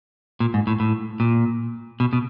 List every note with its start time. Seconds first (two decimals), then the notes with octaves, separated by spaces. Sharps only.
0.40 A#2
0.54 G#2
0.67 A2
0.80 A2
1.20 A#2
2.00 B2
2.13 B2